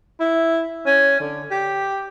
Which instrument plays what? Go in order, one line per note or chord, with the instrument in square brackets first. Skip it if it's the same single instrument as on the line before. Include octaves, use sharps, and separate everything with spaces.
[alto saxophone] E4
C#4
D3
G4